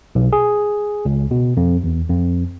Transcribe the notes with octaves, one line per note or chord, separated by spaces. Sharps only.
B1
G#4
C#2
B2
F2
E2
F2